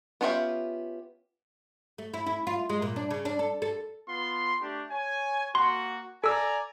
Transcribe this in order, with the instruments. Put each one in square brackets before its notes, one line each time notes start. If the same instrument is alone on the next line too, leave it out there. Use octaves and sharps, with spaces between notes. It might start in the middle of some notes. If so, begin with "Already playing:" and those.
[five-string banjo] B3 C#4 F4 G4 E5
[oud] A3
E4
E4
F4
G#3
A#2
D4
C#3
D4
A4
A4
[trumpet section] B3 F4 C6
A3 D4 G4
C#5 G#5
[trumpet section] A#3 F#4 [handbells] C6
[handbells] A4 E6 [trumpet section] D5 G#5 A#5